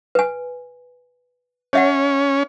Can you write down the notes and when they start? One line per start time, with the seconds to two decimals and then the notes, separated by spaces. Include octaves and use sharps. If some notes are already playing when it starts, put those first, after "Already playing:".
0.15 B4 G#5
1.73 C#4 C#5 E5 F#5